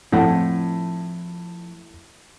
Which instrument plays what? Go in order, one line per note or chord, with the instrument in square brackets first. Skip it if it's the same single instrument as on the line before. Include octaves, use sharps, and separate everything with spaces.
[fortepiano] A2 [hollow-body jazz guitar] F3 C4 F#5